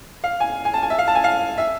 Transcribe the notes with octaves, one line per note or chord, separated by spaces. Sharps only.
F5
G#5
G#5
A5
G#5
E5
F5
A5
G#5
F5
E5